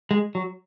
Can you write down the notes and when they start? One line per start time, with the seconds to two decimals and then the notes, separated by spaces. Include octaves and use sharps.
0.11 G#3
0.35 F#3